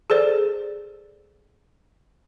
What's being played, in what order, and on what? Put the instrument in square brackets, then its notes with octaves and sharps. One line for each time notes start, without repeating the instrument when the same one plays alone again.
[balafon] G#4 A4 C5 D5